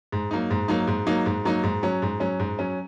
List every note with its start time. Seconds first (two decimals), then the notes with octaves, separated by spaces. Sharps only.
0.12 G#2
0.31 F#3 A#3 D#4
0.51 G#2
0.68 F#3 A#3 D#4
0.87 G#2
1.07 F#3 A#3 D#4
1.26 G#2
1.45 F#3 A#3 D#4
1.63 G#2
1.83 F#3 C#4
2.02 G#2
2.20 F#3 C#4
2.39 G#2
2.59 F#3 C#4